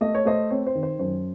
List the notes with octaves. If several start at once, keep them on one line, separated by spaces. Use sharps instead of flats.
A3 D#5
C#5
A3 C5 D#5
C4 C#5
C5
D#3
C5
F#2 C5